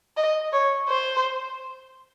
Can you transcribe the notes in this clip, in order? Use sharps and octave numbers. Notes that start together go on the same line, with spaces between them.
D#5
C#5
C5